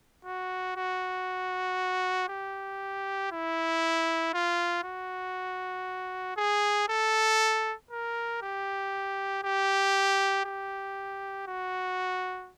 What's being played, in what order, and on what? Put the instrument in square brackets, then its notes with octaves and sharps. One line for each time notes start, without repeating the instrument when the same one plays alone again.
[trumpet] F#4
F#4
G4
E4
F4
F#4
G#4
A4
A#4
G4
G4
G4
F#4